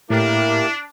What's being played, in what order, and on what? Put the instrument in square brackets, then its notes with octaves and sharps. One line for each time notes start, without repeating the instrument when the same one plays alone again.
[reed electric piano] A2 [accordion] A#3 G4 A#4 [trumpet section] D4 [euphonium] E4